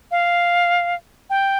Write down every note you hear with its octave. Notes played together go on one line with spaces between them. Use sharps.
F5
G5